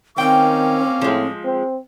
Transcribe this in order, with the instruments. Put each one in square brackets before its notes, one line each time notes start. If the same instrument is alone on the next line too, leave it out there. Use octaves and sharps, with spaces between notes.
[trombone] D#3 [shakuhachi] C4 [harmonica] C#4 F5 D6 [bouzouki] G5
[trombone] A2 [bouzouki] F3 G#3
[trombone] C4